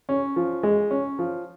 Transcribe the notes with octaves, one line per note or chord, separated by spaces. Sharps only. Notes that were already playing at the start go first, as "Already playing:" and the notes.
C#4
F3
G#3
C#4
F3